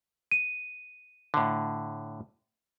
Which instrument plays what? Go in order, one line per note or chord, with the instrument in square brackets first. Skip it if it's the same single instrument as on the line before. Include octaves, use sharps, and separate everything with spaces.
[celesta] D#7
[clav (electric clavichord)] A2 D3